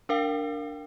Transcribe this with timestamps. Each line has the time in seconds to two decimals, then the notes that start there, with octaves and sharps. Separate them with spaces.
0.09 D4 A#4 F5 G5